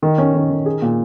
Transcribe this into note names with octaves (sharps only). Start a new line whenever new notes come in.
D#3
C#4
D#3
D#3
G#4
A#2